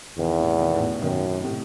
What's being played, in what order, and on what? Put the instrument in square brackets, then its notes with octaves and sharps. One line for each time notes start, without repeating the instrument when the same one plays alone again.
[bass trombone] E2 [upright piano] B2 D#3
[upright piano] A2 C3
B2 D#3
A2
B2
[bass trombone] F#2 [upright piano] B2 D#3
[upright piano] A2 C3